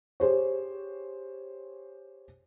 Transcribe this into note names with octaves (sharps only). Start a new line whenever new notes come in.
G4 G#4 C5 C#5